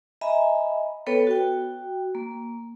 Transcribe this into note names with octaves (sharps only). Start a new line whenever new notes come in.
D#5 E5 G#5 A#5 B5
B3 A4 B4 C#5 G5
F#4 G5
A#3